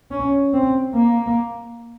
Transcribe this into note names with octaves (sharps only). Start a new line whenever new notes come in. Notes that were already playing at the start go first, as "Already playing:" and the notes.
C#4
C4
A#3